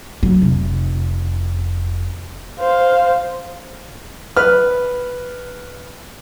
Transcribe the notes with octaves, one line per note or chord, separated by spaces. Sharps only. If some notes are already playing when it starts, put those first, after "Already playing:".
F#3
F1
C5 F5
B4 F6